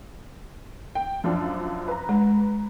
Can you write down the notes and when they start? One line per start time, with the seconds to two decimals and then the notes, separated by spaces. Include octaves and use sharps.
0.95 G5
1.24 F#2 F3 D4
1.88 B4 A#5
2.09 G#3